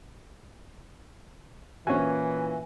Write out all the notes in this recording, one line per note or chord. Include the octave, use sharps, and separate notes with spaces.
A#2 E3 C#4 F#4 G#5